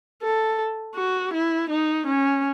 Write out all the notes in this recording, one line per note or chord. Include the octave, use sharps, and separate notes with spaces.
A4
F#4
E4
D#4
C#4